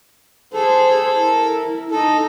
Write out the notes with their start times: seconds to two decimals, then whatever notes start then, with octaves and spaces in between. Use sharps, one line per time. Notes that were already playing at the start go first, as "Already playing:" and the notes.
0.54 G#4 A4 C5
1.18 E4 A#4
1.91 D#4 A4 D#5